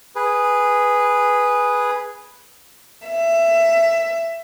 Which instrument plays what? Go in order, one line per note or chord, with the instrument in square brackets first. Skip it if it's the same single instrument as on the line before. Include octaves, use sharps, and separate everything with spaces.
[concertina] G#4 B4
[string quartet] E5